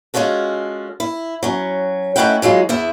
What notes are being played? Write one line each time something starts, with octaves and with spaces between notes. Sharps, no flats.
G#3 C#4 F4 F#4 A4
E4
F#3 C#4
A3 C#4 D#4 E4 F#5 G5
E3 F#3 G#3 F4
E2 B3 E4 E5